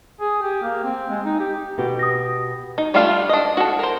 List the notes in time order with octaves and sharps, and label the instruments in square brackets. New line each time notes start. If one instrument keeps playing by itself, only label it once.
[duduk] G#4
G4
A#3
C4
G#3
D#4
G4
[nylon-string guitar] B2 B3 G4
[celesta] D#6 A#6
[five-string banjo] D#4
G3 A3 D4 F4 F5
D4 D#5
F#4 A4
A#4 C5